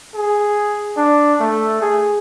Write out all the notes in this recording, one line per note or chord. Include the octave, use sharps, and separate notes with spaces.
G#4
D4
A3
G#4